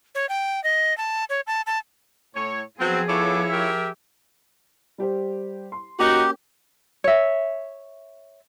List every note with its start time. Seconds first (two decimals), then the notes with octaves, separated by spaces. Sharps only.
0.15 C#5
0.29 G5
0.64 D#5
0.97 A5
1.29 C#5
1.47 A5
1.67 A5
2.35 A2 C#5
2.79 F3 F#3 B3 C4 G#4
3.09 B3 E4 F4 A4 C#5 D6
3.50 G4 A#4 E5
4.98 G3 G4 C5
5.72 C6
5.99 A#3 C#4 D#4 F#4 G4
7.04 C#5 E5